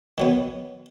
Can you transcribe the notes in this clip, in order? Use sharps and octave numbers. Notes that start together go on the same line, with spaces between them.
D#3 F#3 B3